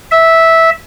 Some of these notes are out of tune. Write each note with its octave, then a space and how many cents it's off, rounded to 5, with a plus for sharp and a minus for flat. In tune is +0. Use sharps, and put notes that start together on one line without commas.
E5 -10